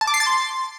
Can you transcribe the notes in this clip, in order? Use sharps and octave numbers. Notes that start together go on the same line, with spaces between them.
A5
D6
C7
A6
C6